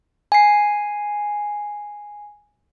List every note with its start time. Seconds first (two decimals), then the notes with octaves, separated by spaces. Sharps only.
0.32 G#5 C7